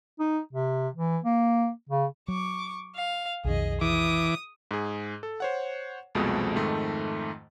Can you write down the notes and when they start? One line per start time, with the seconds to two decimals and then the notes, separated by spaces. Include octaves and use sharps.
0.19 D#4
0.53 C3
0.94 E3
1.24 A#3
1.89 C#3
2.28 F#3 C#6 D6
2.96 F5
3.45 B1 F2 D#3 G#4 D#5
3.81 E3 D6 D#6
4.71 G#2 G#4
5.23 A4
5.40 C5 C#5 F#5
6.15 C2 F2 B2 F3 G#3 A3
6.56 F2 G#2 D#3 A3